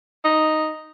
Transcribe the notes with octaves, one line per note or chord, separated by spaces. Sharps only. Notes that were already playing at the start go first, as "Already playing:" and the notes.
D#4